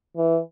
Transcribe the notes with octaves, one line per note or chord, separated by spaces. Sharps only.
E3